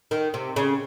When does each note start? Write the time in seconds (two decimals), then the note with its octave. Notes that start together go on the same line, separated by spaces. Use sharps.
0.11 D#3
0.34 C3
0.56 C#3